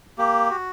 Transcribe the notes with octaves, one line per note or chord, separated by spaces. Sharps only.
A#3 G4
F#4